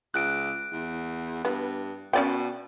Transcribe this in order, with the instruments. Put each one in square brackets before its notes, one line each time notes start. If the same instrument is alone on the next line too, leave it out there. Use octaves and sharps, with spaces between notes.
[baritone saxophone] C#2 [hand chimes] F#6 D7
[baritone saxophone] E2
[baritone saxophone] G2 [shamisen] B3
[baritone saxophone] B2 [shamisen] C#4 D5 G5